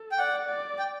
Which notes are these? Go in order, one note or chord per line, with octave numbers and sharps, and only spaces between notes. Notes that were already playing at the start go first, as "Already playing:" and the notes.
Already playing: A4
G5
D5 F#5
D5
G5